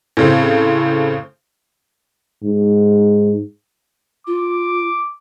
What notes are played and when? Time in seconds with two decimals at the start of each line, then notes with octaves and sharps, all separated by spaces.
0.17 A2 C#3 C4
2.44 G#2
4.27 F4 D6